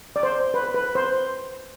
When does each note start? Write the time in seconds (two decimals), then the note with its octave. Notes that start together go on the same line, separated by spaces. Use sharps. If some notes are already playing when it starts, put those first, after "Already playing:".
0.16 D5
0.23 C5
0.54 B4
0.74 B4
0.95 C5